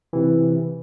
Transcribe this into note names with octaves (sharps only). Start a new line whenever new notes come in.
C3 E3